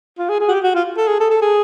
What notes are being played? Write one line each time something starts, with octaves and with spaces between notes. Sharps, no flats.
F4
G#4
G#4
F#4
G4
F#4
F4
A4
G#4
A4
A4
G#4